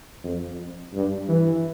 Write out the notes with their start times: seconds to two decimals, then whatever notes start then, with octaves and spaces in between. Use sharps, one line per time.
0.23 F2
0.93 G2
1.28 E3